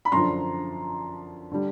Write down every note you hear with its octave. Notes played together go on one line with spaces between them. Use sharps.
B5
F#2 D3 F3 A#5 C6
D3 G3